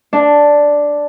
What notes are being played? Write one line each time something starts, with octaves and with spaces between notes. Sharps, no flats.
D4